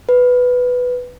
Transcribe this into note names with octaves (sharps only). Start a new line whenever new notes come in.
B4